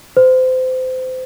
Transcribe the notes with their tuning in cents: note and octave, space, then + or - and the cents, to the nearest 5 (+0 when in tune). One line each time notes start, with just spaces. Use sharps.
C5 -30